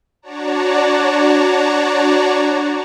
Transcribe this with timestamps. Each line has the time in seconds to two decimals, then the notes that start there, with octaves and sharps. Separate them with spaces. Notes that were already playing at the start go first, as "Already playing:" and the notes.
0.22 D4 F#4 C#5 D5 A5 A#5